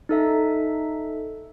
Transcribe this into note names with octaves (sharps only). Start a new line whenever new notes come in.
D#4 A4 E5